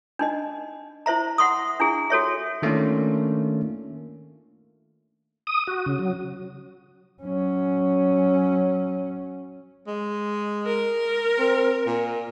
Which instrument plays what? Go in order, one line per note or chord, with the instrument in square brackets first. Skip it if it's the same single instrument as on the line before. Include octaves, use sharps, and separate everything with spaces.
[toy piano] D4 D#4 D#5
E4 C5 E5 A#5
E5 F#5 C6 C#6 D#6
D4 E4 G#4
F#4 A4 C#5 E5
[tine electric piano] D#3 A3 A#3 C#4 D4 F4
[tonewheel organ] D#6
F#4
C#3
F#3
[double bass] F#3 C#4
[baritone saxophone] G#3
[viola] A#4
[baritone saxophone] C4
A#2